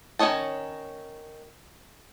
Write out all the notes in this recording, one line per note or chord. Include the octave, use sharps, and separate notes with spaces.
D#3 C#4 C#5 D#5 A5